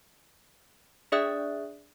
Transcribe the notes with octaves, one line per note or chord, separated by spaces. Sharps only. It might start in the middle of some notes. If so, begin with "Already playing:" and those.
D4 G#4 D5 E5 D#6 F#6